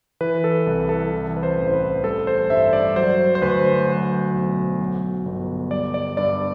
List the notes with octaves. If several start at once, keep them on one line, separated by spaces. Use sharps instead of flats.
E3 B4
A4
C2
A4
E3
B4
C5
A1
C5
B4
G3 A4
C5
G2 E5
D5
F#3 C5
C5
D2 B4
F#3
B1
F#3
G1
G3 D5
D5
G2 D5